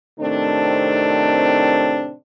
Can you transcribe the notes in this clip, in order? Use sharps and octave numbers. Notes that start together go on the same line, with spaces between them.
A2 C3 D#3 A3 C4 D4